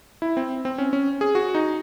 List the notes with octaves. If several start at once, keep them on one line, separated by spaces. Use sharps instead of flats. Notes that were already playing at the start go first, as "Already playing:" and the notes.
E4
C4
C4
C#4
C#4
G#4
F#4
D#4